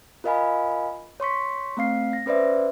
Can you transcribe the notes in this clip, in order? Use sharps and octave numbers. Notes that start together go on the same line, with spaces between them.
F4 A#4 D#5 F5 G#5 B5
C#5 C6 C#6 B6
A3 C4 F5 C7
A#6
C#4 B4 C5 D5 E5